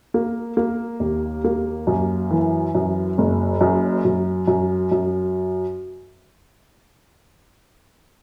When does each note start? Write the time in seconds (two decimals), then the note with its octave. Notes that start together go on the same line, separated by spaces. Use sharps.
0.14 A#3
0.57 A#3
1.00 D#2
1.44 A#3
1.87 F#2
2.30 E3
2.75 F#2
3.18 F#1
3.61 F#2
4.05 F#2
4.47 F#2
4.92 F#2